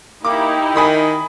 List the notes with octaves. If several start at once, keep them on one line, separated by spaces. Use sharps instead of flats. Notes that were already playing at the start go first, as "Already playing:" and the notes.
A#3 D#4 E4 G4 D6
D#3 G#5 B5 D#6